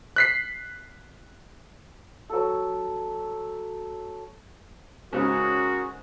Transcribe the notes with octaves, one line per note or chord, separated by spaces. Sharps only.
F#6 B6 C7
F#3 A4
G#2 C#3 C#4 F#4 G#4 A#4